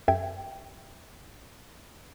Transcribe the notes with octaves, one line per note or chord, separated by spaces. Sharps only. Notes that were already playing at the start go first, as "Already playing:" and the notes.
F#2 G4 A4 E5 G5 G#6